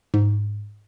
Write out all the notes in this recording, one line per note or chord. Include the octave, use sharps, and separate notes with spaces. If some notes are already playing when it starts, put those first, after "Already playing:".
G#2